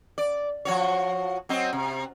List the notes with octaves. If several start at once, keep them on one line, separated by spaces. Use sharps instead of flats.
D5
F3 F#4 C#5
F#3 C4 D#5
C3